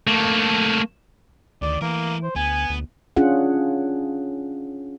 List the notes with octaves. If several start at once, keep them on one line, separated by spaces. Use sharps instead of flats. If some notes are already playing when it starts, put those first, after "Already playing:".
A3 A#3
D2 D#3 D5
E3 A3 A#3 A#4
C5
D2 B3 G#5
D2
C#4 D4 F4 G#4 F#5